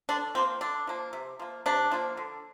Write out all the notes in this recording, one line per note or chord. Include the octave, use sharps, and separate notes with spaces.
D3 D4
F3 A#3 C4
D3 D4
F3 A#3
C3
F3 A#3
C3 D4
F3 A#3
D3